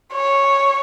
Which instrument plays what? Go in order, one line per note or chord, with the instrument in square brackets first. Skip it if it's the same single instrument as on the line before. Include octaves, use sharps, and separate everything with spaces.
[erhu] C#5